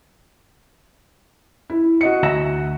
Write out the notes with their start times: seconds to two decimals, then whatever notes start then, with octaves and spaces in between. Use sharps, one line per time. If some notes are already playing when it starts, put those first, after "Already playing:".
1.70 E4
2.01 F#4 D#5 C#7
2.23 D2 E5 A#5